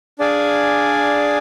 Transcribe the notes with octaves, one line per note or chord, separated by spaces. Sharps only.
D4 G#4 D5 F5 G#5